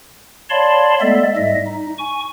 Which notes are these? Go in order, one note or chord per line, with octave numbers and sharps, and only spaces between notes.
C#5 D5 F5 A5 B5 C6
G#3 A3 B3 A4 D5 E5
G#2 G3 D#5 E5
D#4
G#5 C#6